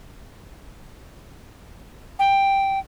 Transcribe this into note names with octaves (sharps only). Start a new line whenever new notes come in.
G5